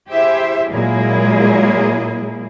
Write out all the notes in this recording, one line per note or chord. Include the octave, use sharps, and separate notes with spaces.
E4 G4 G#4 C5 E5
A#2 F#3 G#3 A#3 E4 G#4